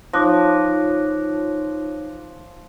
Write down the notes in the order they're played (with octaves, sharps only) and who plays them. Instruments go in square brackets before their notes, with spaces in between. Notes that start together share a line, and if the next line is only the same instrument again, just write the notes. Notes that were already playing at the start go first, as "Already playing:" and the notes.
[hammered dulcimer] F3 [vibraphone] D#4 F4 C#5 [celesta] D6 F#6 A#6